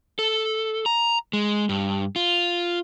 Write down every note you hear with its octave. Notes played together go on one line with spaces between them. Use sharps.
A4
A#5
G#3
G2
F4